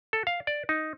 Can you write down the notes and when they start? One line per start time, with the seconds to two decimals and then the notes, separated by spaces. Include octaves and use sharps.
0.13 A4
0.27 F5
0.47 D5
0.69 D#4